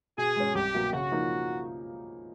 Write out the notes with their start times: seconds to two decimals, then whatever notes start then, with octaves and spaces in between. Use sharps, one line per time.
0.18 B2 G#4
0.36 G#3 C#4
0.55 C2 G4
0.74 B2 F#3 A#3
0.93 C#3 F#4
1.12 F3 A#3 D#4